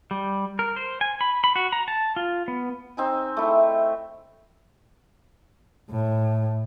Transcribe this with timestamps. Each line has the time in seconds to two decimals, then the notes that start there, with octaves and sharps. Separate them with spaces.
0.11 G3
0.59 A#4
0.76 C5
1.01 G#5
1.21 B5
1.44 B5
1.56 F#4
1.73 A#5
1.88 A5
2.16 F4
2.48 B3
2.97 C4 D#4 G#5
3.37 A3 E4
5.90 A2